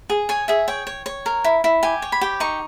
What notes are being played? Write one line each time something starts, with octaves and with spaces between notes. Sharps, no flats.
G#4
C#5 G#5
G#4 E5
C#5 G5
C#5
C#5
A#4
E4
E4
G4 G#5
C#5
B5
G4
D#4 C#6